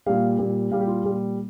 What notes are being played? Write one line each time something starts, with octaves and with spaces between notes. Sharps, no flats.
A#2 G3 F5
A#2 G3
A#2 G3 F5
G4
F4
A#2 G3